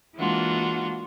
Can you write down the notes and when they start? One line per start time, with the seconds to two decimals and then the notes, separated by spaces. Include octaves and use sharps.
0.15 E3 G#3 A#3 D4 F4 F#4